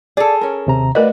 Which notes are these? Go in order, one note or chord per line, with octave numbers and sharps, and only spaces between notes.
G#4 A4 D5
C#4 A#4
D#2 C3 A#5
A3 F#4 A#4 B4 D5 D#5